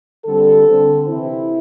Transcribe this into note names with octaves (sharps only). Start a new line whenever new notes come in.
D3 G3 C4 A4
D3 C4
C3 E3 C4 E4